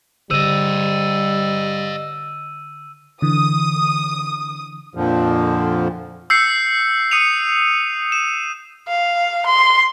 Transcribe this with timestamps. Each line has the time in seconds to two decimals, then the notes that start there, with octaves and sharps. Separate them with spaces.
0.31 D3 G3 C5 D#5 E6 D#7
3.22 D3 E3 D#6
4.95 F2 A#2 D3 F3
6.30 E6 G6 C7 C#7
7.11 D#6 C#7 D#7 F7
8.12 E7
8.88 F5
9.46 C6